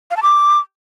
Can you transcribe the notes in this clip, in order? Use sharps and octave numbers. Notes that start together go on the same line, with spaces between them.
F5
A5
D6